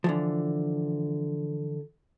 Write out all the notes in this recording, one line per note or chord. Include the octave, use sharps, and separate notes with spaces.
D3 E3 F3